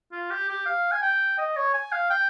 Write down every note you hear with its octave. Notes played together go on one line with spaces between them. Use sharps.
F4
G4
G4
F5
G#5
G5
D#5
C#5
G#5
F5
G5